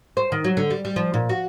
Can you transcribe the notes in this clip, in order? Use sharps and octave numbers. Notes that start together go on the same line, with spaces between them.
C5
D#3
F#3
D3
G3
G3
F3
A#2
F#4